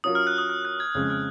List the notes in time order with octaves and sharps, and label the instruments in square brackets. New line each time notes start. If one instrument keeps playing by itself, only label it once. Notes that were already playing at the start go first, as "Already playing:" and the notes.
[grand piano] F#3 C#4 F4 A#4 [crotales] D#6
[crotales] F6
F#6
D#6
F6
F#6
G#6
[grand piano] F2 C#3 F3 G#3 C#4 [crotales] G#6
[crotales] F6